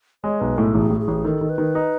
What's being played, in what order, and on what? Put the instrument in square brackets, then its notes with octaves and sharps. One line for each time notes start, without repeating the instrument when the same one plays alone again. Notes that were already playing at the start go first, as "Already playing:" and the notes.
[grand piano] G#3 [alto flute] C#5
[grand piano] B1 [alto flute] B4
[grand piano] A2 [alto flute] A4
[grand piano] A1 [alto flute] G#4
[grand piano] A2
[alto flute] G#4
[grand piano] A1
[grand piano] D#3 [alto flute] A4
[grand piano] D#3
[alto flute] B4
[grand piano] D#3
D#4